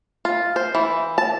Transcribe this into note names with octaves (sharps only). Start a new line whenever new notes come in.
F4
C5
E3
A5